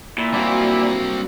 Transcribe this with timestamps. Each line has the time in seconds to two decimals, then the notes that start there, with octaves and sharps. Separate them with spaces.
0.18 A#2 E4
0.33 F#3 G3 A#3 C4 D4